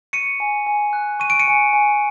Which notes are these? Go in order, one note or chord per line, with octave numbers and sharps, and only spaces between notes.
C#6 C#7 D#7
G#5
G#5
F#6
C#6 D#7
D7
C#7 D#7
G#5
G#5